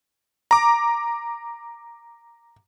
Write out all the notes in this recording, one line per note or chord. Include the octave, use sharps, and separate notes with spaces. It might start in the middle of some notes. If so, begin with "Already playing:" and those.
A#5 D6